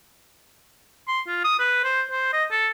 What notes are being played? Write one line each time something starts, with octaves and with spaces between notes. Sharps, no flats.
C6
F4
D#6
B4
C5
C5
D#5
A4